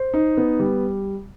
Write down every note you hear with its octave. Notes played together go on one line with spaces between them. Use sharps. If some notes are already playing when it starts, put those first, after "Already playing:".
Already playing: C5
D#4
B3
G3